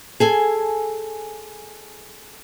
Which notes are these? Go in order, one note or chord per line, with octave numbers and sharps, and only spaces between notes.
G#4 A4 G#5